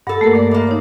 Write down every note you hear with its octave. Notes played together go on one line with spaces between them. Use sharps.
G2 A4 F#5
A3 A#3 A#4
D5
E3 A#3
D#4 C#5